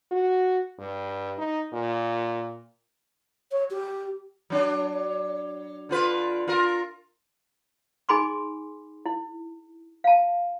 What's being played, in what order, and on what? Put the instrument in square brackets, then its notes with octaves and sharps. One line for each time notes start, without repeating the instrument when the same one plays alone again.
[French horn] F#4
G2
D#4
A#2
[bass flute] C#5
G4
[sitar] F#3 D4
D3 F4 B4
F4 A#4
[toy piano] D#4 G#4 G#5 B5 C6 D6
E4
F5 A5